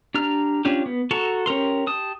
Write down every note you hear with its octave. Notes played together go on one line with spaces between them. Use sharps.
D4 G4 A#5 F6
C#4 D4 F4 G4
B3
F#4 A4 A5 A#5 C#6
C#4 G4 A#4 C6
G4 A5 D#6